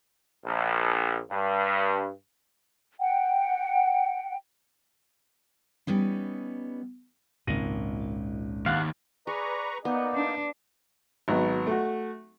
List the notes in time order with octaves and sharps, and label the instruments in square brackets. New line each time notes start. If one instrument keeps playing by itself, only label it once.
[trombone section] A#1
G2
[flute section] F#5 G5
[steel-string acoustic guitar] G3 B3 C#4 D#4
[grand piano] G#1 A#6 D#7 [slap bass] C#2 A#2
[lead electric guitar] D#2 [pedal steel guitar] F5 F#5
[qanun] G#4 [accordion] B4 A#5 C#6 [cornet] D5
[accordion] A#3 D#4 [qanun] B3 [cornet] D5
[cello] D4
[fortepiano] G#1 F#3 B3
A3 F#4